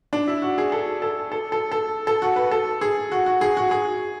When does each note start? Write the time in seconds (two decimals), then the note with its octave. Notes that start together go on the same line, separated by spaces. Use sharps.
0.13 D4
0.27 E4
0.42 F#4
0.58 G#4
0.72 A4
1.02 A4
1.32 A4
1.52 A4
1.72 A4
2.07 A4
2.22 F#4
2.36 B4
2.51 A4
2.81 G#4
3.12 F#4
3.26 F#4
3.41 G#4
3.57 F#4
3.71 G#4